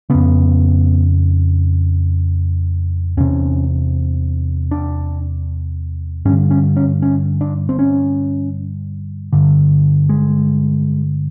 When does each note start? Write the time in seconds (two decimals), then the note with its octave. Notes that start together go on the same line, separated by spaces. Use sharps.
0.10 F2 C#3 B3
3.17 E2 C3 C#4
4.71 D4
6.25 G2 C#4
6.30 D3
6.51 C#4
6.76 C#4
7.02 C#4
7.41 D4
7.69 C4
7.79 C#4
9.33 G2 D3
10.09 G#3